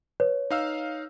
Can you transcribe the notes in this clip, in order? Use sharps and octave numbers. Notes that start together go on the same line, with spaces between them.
B4 C#5
D#4 F5 E6